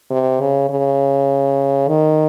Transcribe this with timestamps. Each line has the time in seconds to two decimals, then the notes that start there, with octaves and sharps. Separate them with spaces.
0.11 C3
0.40 C#3
0.69 C#3
1.88 D#3